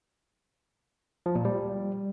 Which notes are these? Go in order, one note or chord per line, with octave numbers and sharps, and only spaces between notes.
F3
A#2
G3